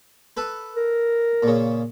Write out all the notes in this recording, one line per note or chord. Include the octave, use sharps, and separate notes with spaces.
A4 B4
A#4
A#2 C#3